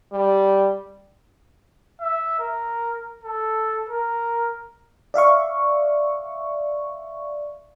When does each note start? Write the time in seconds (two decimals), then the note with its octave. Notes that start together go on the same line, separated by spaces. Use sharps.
0.12 G3
2.01 E5
2.39 A#4
3.23 A4
3.89 A#4
5.14 D5 E5 F5 C#6